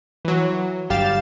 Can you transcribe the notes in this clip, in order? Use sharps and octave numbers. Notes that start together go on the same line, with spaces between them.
E3 F#3
G1 G3 G4 F5 A6 E7